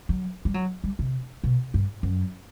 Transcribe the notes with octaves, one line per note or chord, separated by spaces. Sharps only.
F#3
G3
F#3
G3
C3
B2
G2
F#2